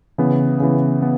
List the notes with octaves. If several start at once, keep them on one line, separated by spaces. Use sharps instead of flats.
C#3 E3 B3
C#3 E3 B3
B3